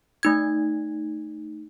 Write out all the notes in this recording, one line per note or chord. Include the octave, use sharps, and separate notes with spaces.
A3 D#4 G#6